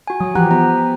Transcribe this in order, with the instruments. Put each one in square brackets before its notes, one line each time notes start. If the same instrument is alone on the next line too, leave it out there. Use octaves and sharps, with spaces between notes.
[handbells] F#4 G#5
[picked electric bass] F#3 [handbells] D#6
[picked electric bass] E3 [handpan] F3 G4 [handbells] F#5 A#5 F#6
[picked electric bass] B3 [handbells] A#5